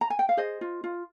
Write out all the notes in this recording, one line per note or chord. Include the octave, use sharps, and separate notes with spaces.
A#5
G#5
G5
F5
G#4 C5 D#5
F4
F4